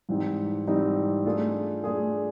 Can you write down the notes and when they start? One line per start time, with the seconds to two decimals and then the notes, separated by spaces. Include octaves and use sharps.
0.09 G#2 E3 G3 C4 D#4
0.68 G#2 E3 G3 C4 D#4
1.26 A3 D4 F4 G#4
1.84 A3 D4 F4 G#4